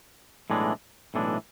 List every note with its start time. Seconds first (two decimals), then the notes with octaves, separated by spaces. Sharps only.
0.50 B1 A2 E3 G#3 D4
1.14 B1 A2 E3 G#3 D4